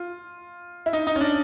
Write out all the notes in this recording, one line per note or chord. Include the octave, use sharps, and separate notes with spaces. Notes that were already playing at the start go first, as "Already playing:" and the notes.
Already playing: F4
E4
D#4
D#4
C#4
D4